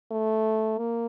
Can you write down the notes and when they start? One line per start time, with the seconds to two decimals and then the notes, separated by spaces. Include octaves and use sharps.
0.11 A3
0.78 A#3